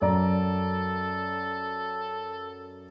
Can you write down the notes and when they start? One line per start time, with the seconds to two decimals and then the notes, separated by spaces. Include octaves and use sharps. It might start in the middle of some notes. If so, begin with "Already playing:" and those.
0.02 F#2 A4 D5 A#5